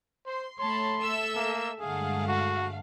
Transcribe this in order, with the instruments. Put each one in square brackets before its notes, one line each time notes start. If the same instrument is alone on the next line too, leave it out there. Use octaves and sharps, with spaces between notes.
[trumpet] C5 [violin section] C6
[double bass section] A3 [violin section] C#5 A5 B5 [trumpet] C6
[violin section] A4 E5 E6
[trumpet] A#3
[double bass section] G2 D3 G#3 [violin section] A3 F5 F#5 [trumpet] G#4
[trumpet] F#4